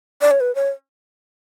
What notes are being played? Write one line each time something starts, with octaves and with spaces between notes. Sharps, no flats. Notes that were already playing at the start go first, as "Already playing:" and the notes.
D5
C#5
B4
C#5